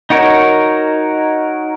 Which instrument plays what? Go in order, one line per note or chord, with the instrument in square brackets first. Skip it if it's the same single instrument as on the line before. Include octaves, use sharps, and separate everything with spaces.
[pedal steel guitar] D#4 F#4 A#4 C#5